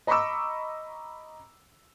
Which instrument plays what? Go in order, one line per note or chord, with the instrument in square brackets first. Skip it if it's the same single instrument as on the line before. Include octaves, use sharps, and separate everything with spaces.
[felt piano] D#5 A#5 B5 C#6 D6 E6